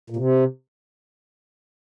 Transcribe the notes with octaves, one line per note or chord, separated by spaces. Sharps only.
A#2
C3